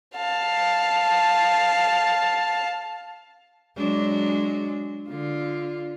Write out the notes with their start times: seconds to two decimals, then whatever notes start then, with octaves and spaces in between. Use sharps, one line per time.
0.15 F5 A5
3.77 F#3 G#3 D4
5.09 D3 F4